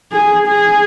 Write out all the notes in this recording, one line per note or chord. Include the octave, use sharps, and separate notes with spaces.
G#4
G#4